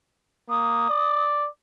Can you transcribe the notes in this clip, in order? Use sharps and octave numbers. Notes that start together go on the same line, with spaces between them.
A#3 D#6
D5